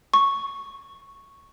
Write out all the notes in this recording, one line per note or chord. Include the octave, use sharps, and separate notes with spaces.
C#6